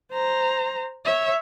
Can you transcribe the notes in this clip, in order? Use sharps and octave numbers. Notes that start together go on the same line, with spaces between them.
C5 A#5
C#5 E5